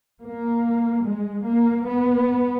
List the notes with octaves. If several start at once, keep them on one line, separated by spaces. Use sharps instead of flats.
A#3
G#3
A#3
B3